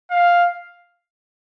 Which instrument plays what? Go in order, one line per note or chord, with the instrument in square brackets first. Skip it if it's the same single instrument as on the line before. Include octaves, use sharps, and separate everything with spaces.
[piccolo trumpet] F5